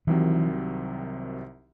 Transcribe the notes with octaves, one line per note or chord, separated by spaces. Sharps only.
C2 C3 D#3 E3 F#3 C4